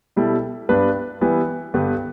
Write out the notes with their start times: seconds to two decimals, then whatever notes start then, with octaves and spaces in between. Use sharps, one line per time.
0.16 B2 G3 E4 A4
0.69 G2 G3 B3 D4 B4
1.21 E3 G3 B3 E4
1.74 G2 D3 B3 G4 B4